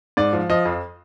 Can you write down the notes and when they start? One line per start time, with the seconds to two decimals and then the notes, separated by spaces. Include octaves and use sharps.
0.17 G#2 D5
0.33 F3
0.49 F3 D#5
0.65 F2